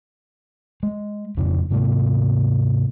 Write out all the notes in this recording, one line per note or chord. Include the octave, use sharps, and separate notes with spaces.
G#3
F2 A#2 C#3
G#2 C3 G#3 A3